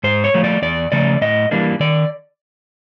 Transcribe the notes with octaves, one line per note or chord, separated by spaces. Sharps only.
G#2 C5
C#5
F3 A3
D5
E2 D5
C#3 F3 A3 D5
A2 D#5
E3 G3 A#3 D4
D#3 D5